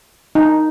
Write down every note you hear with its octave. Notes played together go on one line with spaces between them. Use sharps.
D#4